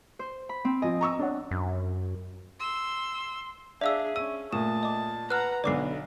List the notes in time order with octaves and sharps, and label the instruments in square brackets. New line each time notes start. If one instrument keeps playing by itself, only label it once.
[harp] C5
B5
C4
[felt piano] F3 G#5 [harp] D#5
[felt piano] A#5 C#6 E6
D4 C#5 F#5
[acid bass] F#2
[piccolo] C6 [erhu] E6
[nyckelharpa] D4 G#4 [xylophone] D5 F5 E6 [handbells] E5
[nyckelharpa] C#4 [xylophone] E6 [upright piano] D#7
[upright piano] A#2 [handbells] A3 D#6 [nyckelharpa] A5 [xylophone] E7
[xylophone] D#5 D6
[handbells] B4 [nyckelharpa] F#5 A#5 [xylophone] F6 F#6
[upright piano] B1 D3 [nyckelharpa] B3 [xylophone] D5 D6 C7